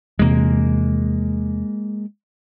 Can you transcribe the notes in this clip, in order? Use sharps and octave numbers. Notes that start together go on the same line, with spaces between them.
E2 C3 G#3 A#3